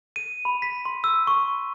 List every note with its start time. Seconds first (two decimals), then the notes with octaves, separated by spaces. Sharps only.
0.16 D#7
0.45 B5
0.62 B6
0.85 C6
1.04 E6
1.27 C#6